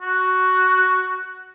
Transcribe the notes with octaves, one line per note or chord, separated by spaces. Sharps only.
F#4